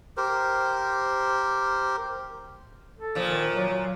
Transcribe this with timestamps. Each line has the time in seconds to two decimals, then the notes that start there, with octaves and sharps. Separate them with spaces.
0.17 G4 A#4 C5
2.99 A4
3.15 A#2 F3
3.28 D#3
3.54 F#3
3.69 F#3